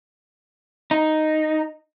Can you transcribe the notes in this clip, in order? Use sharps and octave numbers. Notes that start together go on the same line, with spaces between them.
D#4